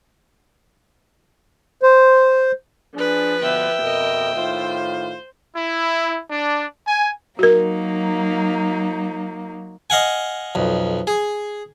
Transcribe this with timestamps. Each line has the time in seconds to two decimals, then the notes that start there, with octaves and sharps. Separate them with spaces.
1.83 C5
2.94 F3 D4 G#4 B4
3.41 B2 D3 E5 G5
3.82 F2 B2 A#4 D#5
4.35 A2 D#3 F4 C5
5.56 E4
6.31 D4
6.86 G#5
7.39 F#3 A#3 D#4 F#4 A#4
9.90 D#5 F5 F#5 G#5
10.55 B1 F2
11.07 G#4